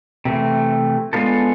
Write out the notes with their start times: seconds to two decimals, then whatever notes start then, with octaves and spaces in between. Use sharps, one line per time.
0.25 C3 E3 A3
1.13 G#3 B3 D4 F4 A4